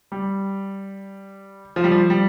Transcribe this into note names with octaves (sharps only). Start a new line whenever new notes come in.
G3
F3
G3
F3
G3